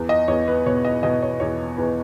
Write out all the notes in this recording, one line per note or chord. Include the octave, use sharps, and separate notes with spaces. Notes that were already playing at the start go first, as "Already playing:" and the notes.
Already playing: E2
D#5
E2 C#5
B4
B2 C#5
D#5
B2 D#5
C#5
E2 C#5
E2 B4